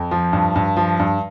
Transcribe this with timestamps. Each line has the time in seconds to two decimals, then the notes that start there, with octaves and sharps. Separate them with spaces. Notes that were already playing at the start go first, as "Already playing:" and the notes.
Already playing: F2
0.11 F3
0.33 G2
0.56 G2
0.77 F3
0.99 G2